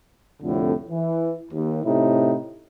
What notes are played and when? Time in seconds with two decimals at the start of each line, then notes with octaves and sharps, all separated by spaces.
0.43 C2 F2 A2 D3
0.90 E3
1.52 D#2
1.84 A2 C3 D#4 E4